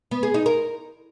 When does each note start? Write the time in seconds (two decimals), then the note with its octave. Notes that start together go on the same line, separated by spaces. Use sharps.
0.11 B3
0.23 G#4
0.34 D#4
0.46 A#4